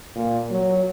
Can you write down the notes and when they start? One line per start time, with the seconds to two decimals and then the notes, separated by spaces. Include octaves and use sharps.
0.15 A#2
0.51 F#3